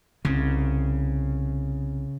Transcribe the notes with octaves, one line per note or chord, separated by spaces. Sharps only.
C2 C#3